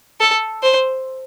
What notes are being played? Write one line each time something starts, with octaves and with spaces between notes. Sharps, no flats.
A4
C5